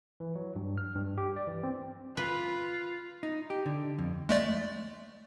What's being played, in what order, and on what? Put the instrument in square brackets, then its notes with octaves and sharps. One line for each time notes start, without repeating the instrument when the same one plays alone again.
[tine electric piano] E3
F#3
G2
F6
G2
G4
D5
E3
C4
[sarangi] F4 [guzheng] B4
[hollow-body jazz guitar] D#4
G4
D3
F2
[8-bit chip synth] G#3 A3 D5